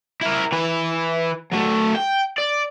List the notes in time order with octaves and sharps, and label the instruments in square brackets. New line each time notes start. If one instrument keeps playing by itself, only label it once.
[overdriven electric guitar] E4 A#4
E3 B4
F#3 A3
G5
D5